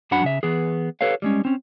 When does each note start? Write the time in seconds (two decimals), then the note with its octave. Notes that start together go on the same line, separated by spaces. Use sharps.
0.11 F#2 F#3 D4 F#5 B5
0.24 C#3 E5
0.43 E3 B3 G#4
1.01 G4 A4 B4 C#5 F5
1.22 G3 G#3 C#4
1.45 C4 C#4